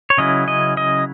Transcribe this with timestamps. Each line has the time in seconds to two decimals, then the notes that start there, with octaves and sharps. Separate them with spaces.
0.10 C#5
0.18 C#3 F#3 C#4 E4 D#5
0.48 D#5
0.77 D#5